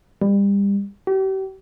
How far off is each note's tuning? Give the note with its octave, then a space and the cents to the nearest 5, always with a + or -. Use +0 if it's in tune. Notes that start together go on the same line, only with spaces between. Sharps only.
G3 +30
G4 -40